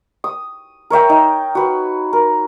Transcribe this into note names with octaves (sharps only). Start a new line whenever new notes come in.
D#6
A#4 C#5 E5 G5
D#4
F#4 B4
A#4